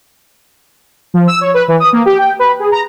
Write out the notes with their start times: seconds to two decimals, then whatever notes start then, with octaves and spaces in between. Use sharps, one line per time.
1.14 F3
1.28 E6
1.41 C#5
1.54 B4
1.68 E3
1.80 D#6
1.93 A#3
2.06 G4
2.18 G5
2.39 B4
2.60 G#4
2.72 A#5